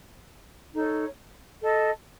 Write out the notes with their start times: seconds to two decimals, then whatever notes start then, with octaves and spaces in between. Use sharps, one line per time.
0.74 D#4 A4 C#5
1.60 A4 D#5 A5